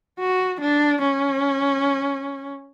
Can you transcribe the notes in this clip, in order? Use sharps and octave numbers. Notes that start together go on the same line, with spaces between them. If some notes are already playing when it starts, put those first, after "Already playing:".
F#4
D4
C#4